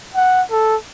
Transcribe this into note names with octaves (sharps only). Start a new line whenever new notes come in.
F#5
A4